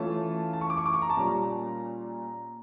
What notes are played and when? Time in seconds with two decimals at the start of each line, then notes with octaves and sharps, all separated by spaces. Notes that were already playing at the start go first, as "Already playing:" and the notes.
Already playing: E3 A3 C#4 F4 A5
0.53 A5
0.61 C#6
0.70 D6
0.78 C#6
0.86 D6
0.94 C#6
1.02 A#5
1.10 A5
1.17 A#2 G3 C#4 F4 A#5